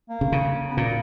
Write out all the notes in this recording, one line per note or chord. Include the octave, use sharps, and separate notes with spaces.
A#3
C#3
C#3
B3
A#2 A#3